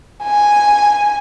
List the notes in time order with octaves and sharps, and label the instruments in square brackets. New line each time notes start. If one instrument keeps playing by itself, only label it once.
[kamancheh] G#5